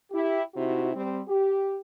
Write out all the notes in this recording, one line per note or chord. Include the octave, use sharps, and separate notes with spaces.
E4 G4
C3 D#4 E4 F#4
G3 C4
G4